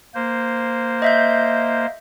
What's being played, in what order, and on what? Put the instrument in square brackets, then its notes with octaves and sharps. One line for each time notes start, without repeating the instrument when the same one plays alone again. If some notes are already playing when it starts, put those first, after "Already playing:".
[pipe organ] A#3 C5
[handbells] D#5 E5 G6